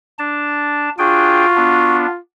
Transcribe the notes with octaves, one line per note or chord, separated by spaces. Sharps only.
D4 A5
D4 F4 F#4 G#4 G5
B3 D4